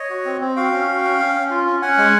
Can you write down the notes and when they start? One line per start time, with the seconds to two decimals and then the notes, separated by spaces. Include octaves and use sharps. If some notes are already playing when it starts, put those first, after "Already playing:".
Already playing: C#5 D#5
0.10 F#4
0.25 C4
0.40 C4
0.56 F#4 F5 G5
0.71 C#4
0.88 F#4
1.04 C#4
1.19 C#4
1.34 C#4
1.50 F4
1.66 C#4
1.82 C#4 F#5 G#5
1.98 G#3